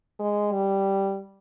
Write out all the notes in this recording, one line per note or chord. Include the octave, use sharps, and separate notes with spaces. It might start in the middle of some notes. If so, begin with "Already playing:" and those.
G#3
G3